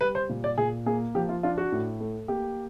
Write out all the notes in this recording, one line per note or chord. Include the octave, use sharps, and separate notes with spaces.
G3 B4
C5
A#2
D5
A#2 G#4
A#3 G#4
F3 G4
F4
D4 F4
F#4
A2
A3
A#3 G4